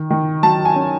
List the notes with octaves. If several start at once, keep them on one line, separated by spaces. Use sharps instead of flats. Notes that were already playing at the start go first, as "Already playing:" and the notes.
Already playing: D#3
D#3
F#3 A5
G#5
C#4